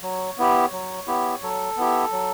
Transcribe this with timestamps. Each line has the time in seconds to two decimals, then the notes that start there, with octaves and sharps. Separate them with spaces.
0.02 F#3 C#5
0.38 B3 E4 G4
0.72 F#3
1.07 B3 E4 G4
1.42 F#3 A4
1.77 B3 E4 G4
2.12 F#3